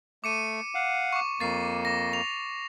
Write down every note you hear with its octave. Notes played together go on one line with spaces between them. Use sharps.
A3 D6 C#7 D#7
F5 F#5
C#6 D6
F2 A#3 A6 C7
D6 A#6
F7